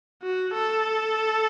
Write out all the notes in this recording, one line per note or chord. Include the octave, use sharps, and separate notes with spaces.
F#4
A4